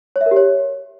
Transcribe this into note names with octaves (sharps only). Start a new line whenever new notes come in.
C#5
E5
A#4
G4
C#5